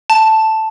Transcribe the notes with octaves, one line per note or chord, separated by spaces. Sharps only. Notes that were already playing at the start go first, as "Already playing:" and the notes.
A5